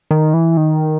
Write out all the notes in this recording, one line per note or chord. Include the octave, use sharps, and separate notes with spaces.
D#3
E3
D#3